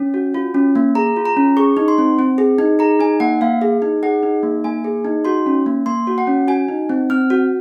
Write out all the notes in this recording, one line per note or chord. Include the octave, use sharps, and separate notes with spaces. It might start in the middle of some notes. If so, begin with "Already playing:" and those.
Already playing: C#4
F#4
F4
C#4
A#3
G#4 A#5
F4
A#5
C#4
G#4 C#6
D#4
C6
C4
C4
G#4
D#4
G#4 A#5
D#4 G#5
A#3 F#5
A#3 F5
G#4
D#4
G#4 F#5
D#4
A#3
A#3 G#5
G#4
D#4
F#4 C6
C#4
A#3
A#3 C6
F#4
F#5
C#4
F#4 G#5
D#4
C4
C4 F6
F#4